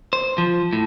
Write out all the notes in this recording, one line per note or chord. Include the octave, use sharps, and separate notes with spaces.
C5
F3
A2